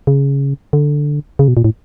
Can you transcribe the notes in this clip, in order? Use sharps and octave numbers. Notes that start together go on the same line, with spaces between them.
C#3
D3
C#3
B2
A#2
A2